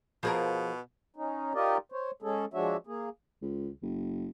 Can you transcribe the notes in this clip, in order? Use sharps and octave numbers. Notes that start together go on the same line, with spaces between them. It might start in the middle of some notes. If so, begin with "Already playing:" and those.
B2 F3 G#4 A#4
C#4 D#4
D#4 F4 G4 A#4 D5 D#5
C5 C#5
G#3 C#4 G#4 A4
F3 G#3 D4 F#4 C#5 E5
A#3 G#4
C#2
F#1